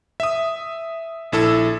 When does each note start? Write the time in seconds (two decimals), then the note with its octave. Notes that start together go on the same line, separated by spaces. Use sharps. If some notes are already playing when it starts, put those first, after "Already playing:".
0.20 E5 D#6
1.32 A#1 E4 A4 E6